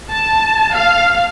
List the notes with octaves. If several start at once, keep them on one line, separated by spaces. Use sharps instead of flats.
A5
F5